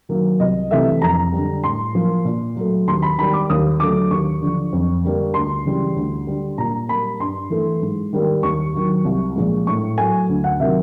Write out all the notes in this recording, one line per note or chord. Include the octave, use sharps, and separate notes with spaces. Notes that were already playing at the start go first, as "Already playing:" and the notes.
D#3 F#3 A#3
C2 D#5
C3 E3 A3 E5
F2 A#5
D3 G3
A2 C6
F3 A#3
A#2
F#3 A3
D#2 C6
B5
D#3 G3 B5
D6
D#2 D#6
D3 F#3 A3 D6
D#2 C#6
D3 F3
F2
D3 G3 A#3
D2 C6
C#3 E3 G3
D2
D3 G3
A#2 A#5
G3 A#3 B5
G2 C6
E3 A3
G#2
D#3 G3 A#3
D#2 C#6
D#3 F#3
C2
A#2 F3 G#3
A2 C#6
F#3 A3 G#5
D2
F#5
C3 D#3 F#3 A#3 E5